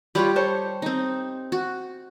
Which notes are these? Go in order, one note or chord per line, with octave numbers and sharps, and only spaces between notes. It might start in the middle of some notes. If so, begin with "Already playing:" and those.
G3 F4 G4 C#5 B5
A4 C5 C#5
C4 D#4
F#4